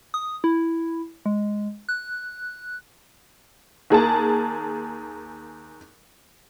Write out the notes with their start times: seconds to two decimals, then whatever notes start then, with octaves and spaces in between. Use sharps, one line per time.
0.14 D#6
0.44 E4
1.26 G#3
1.89 F#6
3.90 D#2 G#4 A#4 A5